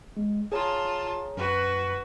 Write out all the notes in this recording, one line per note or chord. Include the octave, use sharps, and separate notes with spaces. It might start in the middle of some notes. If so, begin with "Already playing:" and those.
G#3
F4 G#4 C#5 A5 A#5
F#2 F#4 B4